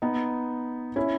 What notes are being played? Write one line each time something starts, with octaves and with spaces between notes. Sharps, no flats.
B3 D#4
C#4 E4